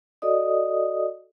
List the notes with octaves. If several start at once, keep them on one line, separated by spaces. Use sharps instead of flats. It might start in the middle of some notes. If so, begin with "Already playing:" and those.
F#4 A4 D5 D#5 D#6